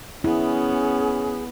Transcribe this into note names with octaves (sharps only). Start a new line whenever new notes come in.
B3 C#4 E4 G#4